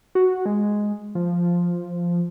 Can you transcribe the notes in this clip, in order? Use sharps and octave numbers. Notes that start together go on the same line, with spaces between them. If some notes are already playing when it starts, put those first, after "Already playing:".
F#4
G#3
F3